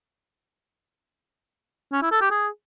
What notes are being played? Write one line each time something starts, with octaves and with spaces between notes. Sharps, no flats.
C#4
E4
A4
G4
G#4